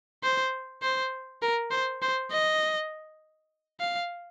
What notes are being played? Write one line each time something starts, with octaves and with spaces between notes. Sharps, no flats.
C5
C5
A#4
C5
C5
D#5
F5